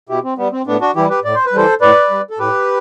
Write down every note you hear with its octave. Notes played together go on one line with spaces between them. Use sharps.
B2 E4 G4
C4
G3 B3
C4
A2 B3 D4
D4 F#4
E3 G3 E4 G4
G4 B4
A2 D5
C5
B4
E3 G3 A4 C5
A2 B4 D5
G3
A4
A2 G4 B4